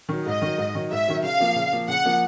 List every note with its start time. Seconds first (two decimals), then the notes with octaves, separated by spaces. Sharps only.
0.09 D#3 F#3
0.26 G#2 D#5
0.42 D#3 F#3
0.58 G#2
0.75 D#3 F#3
0.91 G#2 E5
1.07 D#3 F#3
1.23 C#3 F5
1.40 F3 A#3
1.55 C#3
1.73 F3 A#3
1.88 C#3 F#5
2.05 F3 A#3